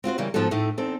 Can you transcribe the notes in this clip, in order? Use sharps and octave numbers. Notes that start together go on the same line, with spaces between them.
C4 F4 F#4 C5
C#3 E3 G3 A#3
G#2 F3 B3 D#4 F#4 A4
A2 A3 C4 D#4
E2 C4 D#4 A4